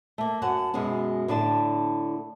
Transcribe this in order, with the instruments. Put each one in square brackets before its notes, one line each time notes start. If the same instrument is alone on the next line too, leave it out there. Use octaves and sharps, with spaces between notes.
[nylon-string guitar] A3 A#3
F#2 C#4 F#5 A5
F#2 B2 G#3 B3 C#4
A2 D3 D4 E4 A5